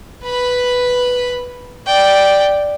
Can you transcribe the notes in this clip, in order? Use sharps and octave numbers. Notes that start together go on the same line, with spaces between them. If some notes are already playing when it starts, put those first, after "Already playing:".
B4 B5
D5 G5